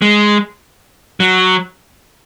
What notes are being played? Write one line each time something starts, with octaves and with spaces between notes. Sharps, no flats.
G#3
F#3